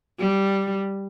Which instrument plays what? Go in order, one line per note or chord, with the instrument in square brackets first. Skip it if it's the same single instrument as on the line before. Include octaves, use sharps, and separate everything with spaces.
[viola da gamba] G3